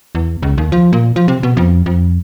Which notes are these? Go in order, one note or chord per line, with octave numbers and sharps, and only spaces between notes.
E2
C#2
D#2
F3
A#2
F3
C3
B2
F2
F2